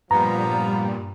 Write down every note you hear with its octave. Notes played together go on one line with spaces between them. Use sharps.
G2 A#2 F3 G3 B3 A#5